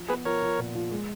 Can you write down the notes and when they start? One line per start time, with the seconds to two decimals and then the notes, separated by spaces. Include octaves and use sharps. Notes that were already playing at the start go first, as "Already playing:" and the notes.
Already playing: F3
0.09 B3 G#4 B4
0.25 F3 A#4 C#5
0.42 F3
0.58 A#2
0.75 F3
0.91 G#3